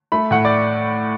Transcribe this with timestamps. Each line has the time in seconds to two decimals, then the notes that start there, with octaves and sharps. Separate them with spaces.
0.12 A3 B5
0.31 A2 F#5
0.45 D5